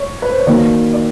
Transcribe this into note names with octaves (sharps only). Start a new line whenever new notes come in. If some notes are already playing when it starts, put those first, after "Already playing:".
Already playing: C#5
B4
C5
C#5
D#3 F#3 A#3 D5
D5